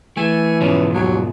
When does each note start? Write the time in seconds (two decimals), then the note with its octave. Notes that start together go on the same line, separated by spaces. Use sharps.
0.17 E3 A3 G#5
0.61 G#2 B2 F3 C#4
0.94 D#2 F#3